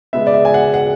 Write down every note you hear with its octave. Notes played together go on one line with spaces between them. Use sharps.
C#3 G#3 B3 E5
D5
E5
G#5
F#5
F#5